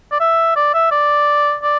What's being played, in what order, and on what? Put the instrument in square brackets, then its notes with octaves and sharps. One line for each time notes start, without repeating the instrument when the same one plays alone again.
[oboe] D5
E5
D5
E5
D5
D5